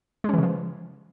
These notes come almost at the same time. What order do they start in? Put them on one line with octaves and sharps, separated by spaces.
G#3 C#4 E3 C#3 F3